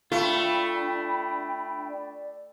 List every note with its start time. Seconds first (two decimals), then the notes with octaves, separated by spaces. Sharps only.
0.12 A3 D4 F4 G5 B5
1.87 D5